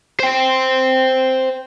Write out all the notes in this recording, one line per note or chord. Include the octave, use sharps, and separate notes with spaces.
C5 G5